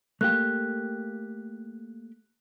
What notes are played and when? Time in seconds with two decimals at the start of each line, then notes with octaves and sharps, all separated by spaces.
0.21 A3 A#3 G4 F#6